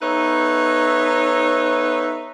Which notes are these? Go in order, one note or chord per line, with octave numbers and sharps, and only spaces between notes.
B3 D#4 A4 B4 C#5 E5